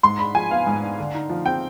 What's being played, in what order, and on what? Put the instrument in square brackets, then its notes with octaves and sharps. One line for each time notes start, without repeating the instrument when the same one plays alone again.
[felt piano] G#2 [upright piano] C6
[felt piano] D4 [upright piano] B5
[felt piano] F3 [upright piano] G#5
[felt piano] B3 [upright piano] F5
[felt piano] G#2
D4
D3
D#4
F3
[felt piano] C4 [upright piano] G5